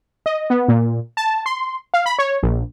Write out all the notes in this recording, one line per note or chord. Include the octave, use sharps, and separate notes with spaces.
D#5
B3
A#2
A5
C6
F5
B5
C#5
A#1